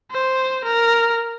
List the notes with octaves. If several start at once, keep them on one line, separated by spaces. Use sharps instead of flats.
C5
A#4